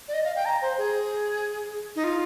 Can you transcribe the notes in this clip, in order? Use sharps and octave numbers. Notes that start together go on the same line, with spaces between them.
D5
D#5
F5
G5
A#5
C5
G#4
D#4
F4